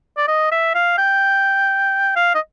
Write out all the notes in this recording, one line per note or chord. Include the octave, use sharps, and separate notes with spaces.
D5
D#5
E5
F5
G5
F5
D#5